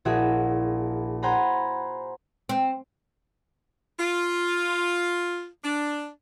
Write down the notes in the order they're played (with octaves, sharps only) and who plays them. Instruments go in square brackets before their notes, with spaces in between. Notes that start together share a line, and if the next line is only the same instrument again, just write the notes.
[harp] A#1 E4 F#4 G#4 A#4 E5
C5 F#5 G#5 A#5 B5
[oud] C4
[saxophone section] F4
D4